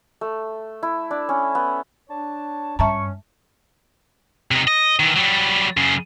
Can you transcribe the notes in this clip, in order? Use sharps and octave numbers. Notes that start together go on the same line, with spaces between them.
A3
E4
D4
C#4
B3
D4 C#5 A5
G2 C#4 E5 A5 A#5 C#6
C3 D#4
D#5
D#3 E3
F#3 G3
F#2 C#3